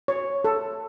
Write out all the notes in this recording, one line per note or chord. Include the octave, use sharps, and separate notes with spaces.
C#5
A4